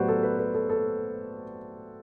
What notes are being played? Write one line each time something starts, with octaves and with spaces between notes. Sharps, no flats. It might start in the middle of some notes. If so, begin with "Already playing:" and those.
Already playing: A2 F#3 B3 F#4 G4 B4 C5 D5
A4
B4
B4
A4
A4